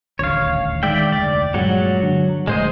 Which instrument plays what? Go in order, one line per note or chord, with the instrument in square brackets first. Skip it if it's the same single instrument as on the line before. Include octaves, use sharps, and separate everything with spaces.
[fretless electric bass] D#1 A1 D2 [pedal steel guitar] C#5 F5
[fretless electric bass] D#3 G#3 [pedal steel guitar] D5 E5 G5
[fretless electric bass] F1 D2 [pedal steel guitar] D5
[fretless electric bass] G2 A#2 G#3 [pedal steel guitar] F#3 F#5
[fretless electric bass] D3
[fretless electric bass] D#1 D2 A2 [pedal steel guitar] G#3 C5 D#5